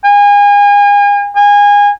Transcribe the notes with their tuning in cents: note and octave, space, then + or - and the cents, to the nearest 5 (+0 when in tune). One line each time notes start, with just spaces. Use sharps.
G#5 -35
G#5 -25